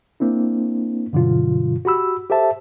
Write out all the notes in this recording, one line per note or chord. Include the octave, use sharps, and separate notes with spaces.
A#3 C4 D4 E4
G2 B2 D3 E3 F#3 F4
F#4 G4 B5 E6
G4 A4 C5 E5 A5